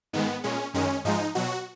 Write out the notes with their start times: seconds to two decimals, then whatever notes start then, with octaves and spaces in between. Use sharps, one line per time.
0.13 G#2 D#3 G#3 B3
0.44 A#2 G#3 C#4
0.74 F#2 D#3 G#3 C#4
1.05 G#2 F3 G#3 D#4
1.35 B2 F#3 F#4